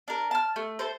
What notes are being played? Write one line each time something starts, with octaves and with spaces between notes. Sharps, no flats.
D4 A#4
A5 F6
A3
A4 C5